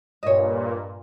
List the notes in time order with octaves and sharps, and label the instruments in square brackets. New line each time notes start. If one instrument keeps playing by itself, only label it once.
[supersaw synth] G2 A#2 [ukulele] C#5 D#5